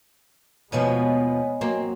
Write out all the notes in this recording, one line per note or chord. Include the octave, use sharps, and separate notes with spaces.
D#2 B2 F3 G#3 B3 C#5 D#5 G#5
F#3 A#3 C4